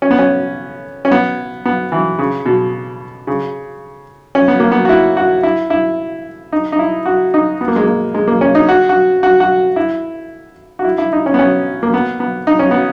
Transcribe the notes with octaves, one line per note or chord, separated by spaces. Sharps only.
C#4
B3
C#4
C#4
B3
B3
E3
C#3
B2
C#3
C#4
B3
A#3
B3
F#4
E4
F#4
E4
E4
D#4
D#4
E4
F#4
D#4
B3
A#3
G#3
A#3
G#3
A#3
C#4
D#4
F#4
F#4
F#4
F#4
E4
F#4
E4
E4
D#4
C#4
B3
C#4
A#3
B3
B3
D#4
C#4
B3